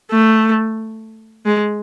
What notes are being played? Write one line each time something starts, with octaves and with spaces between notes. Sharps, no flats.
A3
G#3